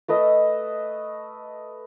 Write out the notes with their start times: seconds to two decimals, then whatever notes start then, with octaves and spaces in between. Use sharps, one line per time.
0.08 A3 B4 D#5 E5